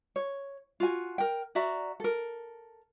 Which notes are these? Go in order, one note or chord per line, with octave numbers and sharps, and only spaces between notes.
C#5
F4 F#4 G#5
A#4 G5
F#4 D5 E5 A#5
A4 A#4